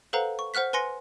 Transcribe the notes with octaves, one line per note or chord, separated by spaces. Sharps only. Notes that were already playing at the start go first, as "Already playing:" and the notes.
A4 B4 C5 F5 F#5 A#5
C#6
C5 F#5 F6 F#6 B6
B4 G#5 C6 A#6 C#7